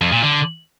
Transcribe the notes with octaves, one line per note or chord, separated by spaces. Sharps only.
F2
A#2
D3